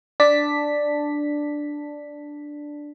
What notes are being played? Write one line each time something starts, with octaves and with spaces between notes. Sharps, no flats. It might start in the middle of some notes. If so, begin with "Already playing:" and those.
D4 D5 A5 B6